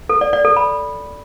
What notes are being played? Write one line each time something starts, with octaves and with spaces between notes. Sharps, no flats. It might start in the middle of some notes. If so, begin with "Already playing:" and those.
A4
D5
D5
A4
B5